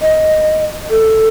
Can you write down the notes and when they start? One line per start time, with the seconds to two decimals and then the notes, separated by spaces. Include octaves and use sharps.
0.02 D#5
0.90 A4